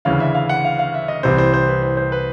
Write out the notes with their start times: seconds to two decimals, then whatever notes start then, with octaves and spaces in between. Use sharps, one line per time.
0.05 D2 C#3 E3 F5
0.20 E5
0.35 F5
0.49 F#5
0.65 F5
0.79 F5
0.94 E5
1.08 D#5
1.23 C2 C3 E3 C5
1.38 C5
1.54 C5
1.68 B4
1.83 C5
1.97 C5
2.12 B4